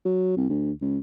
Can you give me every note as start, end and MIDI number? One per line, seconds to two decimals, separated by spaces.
0.05 0.36 54
0.37 0.48 36
0.49 0.72 38
0.81 0.99 37